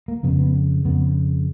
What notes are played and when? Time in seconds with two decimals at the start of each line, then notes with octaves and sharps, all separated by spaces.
0.08 A#3
0.23 F2 C#3 B3
0.39 B3
0.84 F2 C#3 B3